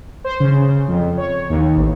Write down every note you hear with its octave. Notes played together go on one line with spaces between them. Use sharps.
C5
C#3
F2
C#5
D#2
A1